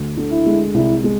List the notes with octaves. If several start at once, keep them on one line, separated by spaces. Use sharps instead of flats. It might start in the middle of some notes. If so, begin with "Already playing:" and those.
Already playing: D2
D3
E4
G#3
C2 E4
G#3